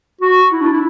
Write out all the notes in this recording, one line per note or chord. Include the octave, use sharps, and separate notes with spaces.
F#4
E4
D4
E4